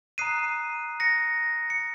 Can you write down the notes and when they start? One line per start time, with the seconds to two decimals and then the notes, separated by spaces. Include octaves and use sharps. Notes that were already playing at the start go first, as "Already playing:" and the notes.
0.18 A#5 D#6 F#6 C7 D#7
1.00 A#6 C#7
1.70 C#7